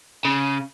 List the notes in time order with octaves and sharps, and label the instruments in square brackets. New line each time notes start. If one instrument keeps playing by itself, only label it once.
[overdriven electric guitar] C#3